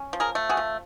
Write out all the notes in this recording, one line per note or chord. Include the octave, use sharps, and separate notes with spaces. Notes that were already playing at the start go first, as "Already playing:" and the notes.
Already playing: C#4
F3
G#4 A#4
A3
F#4 G#4
F3